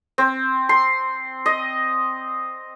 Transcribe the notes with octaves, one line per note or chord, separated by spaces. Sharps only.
C4
C6
D#5